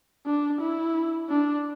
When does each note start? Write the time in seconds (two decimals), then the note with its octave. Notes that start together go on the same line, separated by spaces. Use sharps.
0.26 D4
0.61 E4
1.30 D4